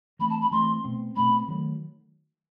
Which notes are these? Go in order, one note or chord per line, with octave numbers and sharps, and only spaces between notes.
E3 A3 C4 B5
A5
B5
E3 A3 C4 C6
B2 A3 C4
B2 A3 C4 B5
D#3 F#3 A3